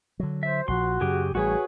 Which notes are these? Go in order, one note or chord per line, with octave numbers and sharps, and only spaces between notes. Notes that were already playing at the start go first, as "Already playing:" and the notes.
D3 F#3
C5 E5
A#1 D3 F3 F#4 C6
F#2 C#3 F#3 G4 G#4
A1 G3 F#4 G#4 B4 C#5